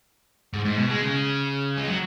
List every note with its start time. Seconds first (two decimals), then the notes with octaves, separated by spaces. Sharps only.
0.53 G#2
0.65 G#2
0.77 B2
0.90 G#3
1.02 C#3
1.77 G#3
1.88 F#3